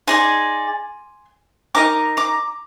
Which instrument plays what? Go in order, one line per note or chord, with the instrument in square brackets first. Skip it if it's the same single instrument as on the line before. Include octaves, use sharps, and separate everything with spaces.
[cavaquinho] D#4 G#4 D5 G#5 C6
D#4 A#4 D#5 A#5 D6
A#5 D6